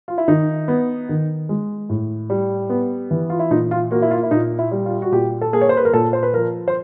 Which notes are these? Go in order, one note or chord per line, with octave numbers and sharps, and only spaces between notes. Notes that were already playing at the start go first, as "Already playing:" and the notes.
F4
E4
D#3 D#4
B3
D#3
G#3
A2
G3
B3
E3
F4
E4
A#2 D#4
F4
A#3 F#4
E4
F4
E4
A#2 D#4
E4
G3
F4
F#4
A#2 G4
A4
A#3 G#4
C#5
C5
B4
A#4
A#2 A4
C5
B4
F3 A#4
C5